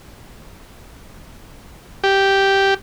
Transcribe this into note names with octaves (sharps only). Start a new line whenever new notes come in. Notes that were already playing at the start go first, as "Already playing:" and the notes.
G4